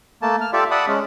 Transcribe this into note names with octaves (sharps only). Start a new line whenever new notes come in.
A3 A#3 A5
F6
F4 G4 A4 D5 E5
D5 E5 F#5 A5 B5 D#6
G#3 C#4